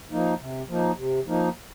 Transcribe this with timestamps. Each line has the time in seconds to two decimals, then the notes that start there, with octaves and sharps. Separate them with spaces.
0.11 F3 A#3 D#4
0.40 C3
0.69 F3 A#3 D#4
0.97 C3
1.26 F3 A#3 D#4